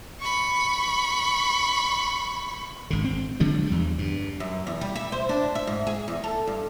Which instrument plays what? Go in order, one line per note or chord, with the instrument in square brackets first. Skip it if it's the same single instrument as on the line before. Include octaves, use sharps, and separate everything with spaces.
[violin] B5 C#6
[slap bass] G#1 D3
C4
D3 F3 F#3 G#3
E2 G3
G2
[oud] F#2
E2
G3
E5
C5
D4
E5
G#2
G#4
E2
A4
G2